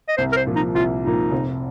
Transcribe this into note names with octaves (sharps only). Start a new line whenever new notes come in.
D#5
C2 C5
A#4
C5
A#2 F3
D#4
C2 F4
A#2 F3 D#4
F1